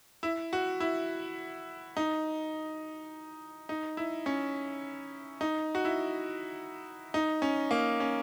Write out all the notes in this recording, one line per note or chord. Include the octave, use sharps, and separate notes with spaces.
E4
F#4
E4
D#4
D#4
E4
C#4
D#4
F#4
E4
D#4
C#4
A#3
C#4